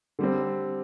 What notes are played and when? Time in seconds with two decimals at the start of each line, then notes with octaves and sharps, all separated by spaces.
0.19 D3 G3 C4